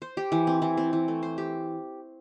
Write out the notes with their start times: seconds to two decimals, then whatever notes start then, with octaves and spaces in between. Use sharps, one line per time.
0.02 C5
0.17 G4
0.32 E3
0.47 C4
0.62 E3
0.77 C4
0.93 E3
1.08 A3
1.22 C5
1.38 G4